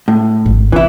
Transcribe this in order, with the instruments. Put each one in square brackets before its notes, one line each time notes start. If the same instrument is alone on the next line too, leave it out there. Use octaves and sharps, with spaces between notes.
[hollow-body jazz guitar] A2
[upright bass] G#1
[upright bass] C3 [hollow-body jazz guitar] E3 E4